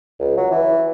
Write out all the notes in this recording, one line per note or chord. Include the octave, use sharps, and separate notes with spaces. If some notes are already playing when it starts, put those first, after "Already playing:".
C#2
F#3
E3